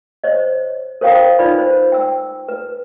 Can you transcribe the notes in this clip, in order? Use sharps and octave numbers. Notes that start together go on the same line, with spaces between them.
C5 C#5 D#5
A#4 C5 C#5 F5 G5 D#6
D#4 F4 B4 D5 B5
C5
G5 E6
B4